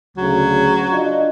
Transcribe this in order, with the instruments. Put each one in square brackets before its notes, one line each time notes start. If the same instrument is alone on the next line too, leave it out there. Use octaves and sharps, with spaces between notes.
[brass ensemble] D2 C#3 [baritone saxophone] F#3
[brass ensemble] D4 F4 D#5